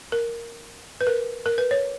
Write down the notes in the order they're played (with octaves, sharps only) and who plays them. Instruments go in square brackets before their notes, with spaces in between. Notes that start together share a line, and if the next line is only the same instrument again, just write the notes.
[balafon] A#4
B4
A#4
A#4
B4
C#5